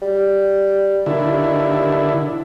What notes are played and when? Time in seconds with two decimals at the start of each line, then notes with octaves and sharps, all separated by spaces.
0.02 G3
1.06 D#2 D3 E4